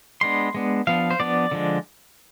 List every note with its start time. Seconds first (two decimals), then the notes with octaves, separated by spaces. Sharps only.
0.21 G#3 B3 D4 C6
0.54 G#3 B3 D4
0.87 F3 B3 D4 F5
1.11 C5
1.20 F3 B3 D4 D5
1.51 D3 F3 G#3 D4